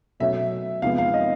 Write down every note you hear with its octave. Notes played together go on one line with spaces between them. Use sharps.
B2 F#3 A3 C#4 E5
C3 F3 G#3 B3 F5
F5
D#5